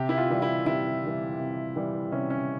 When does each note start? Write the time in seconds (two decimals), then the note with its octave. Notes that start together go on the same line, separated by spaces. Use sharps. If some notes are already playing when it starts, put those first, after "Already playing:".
Already playing: C3 G4
0.09 E4
0.18 F4
0.30 E3 G3
0.42 E4
0.66 C3 E4
1.03 E3 G3
1.40 C3
1.76 E3 G3
2.12 C3 C#4
2.30 C#4